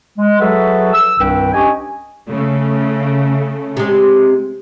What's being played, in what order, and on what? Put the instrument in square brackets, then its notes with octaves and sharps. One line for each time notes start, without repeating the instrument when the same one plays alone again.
[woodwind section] G#3
F#3 F#4 G#4 A4 B4 E5
E6
C2 G2 D#3 C4 B4 G5
C#4 D4 G4 D#5 G#5
[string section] C#3 A3
[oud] C3 G#3